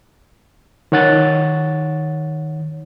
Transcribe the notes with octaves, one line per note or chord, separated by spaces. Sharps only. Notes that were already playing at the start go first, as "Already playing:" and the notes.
D#3 C#5 F#5 A6